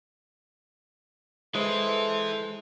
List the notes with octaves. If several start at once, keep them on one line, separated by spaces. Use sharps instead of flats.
G#3 E4 A4 B4 C5